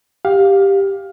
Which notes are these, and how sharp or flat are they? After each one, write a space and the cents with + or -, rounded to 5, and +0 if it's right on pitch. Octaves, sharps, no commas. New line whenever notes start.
G4 +5 F5 +15